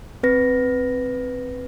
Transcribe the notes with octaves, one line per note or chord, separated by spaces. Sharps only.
C4 B4 A#6